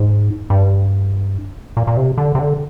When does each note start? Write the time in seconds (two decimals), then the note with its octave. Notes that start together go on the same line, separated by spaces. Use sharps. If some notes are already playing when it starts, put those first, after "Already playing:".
Already playing: G#2
0.50 G2
1.77 A#2
1.87 A#2
1.97 C3
2.18 D3
2.35 C3
2.39 D3